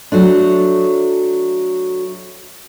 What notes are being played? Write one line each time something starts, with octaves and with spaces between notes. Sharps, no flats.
F#3 A3 D4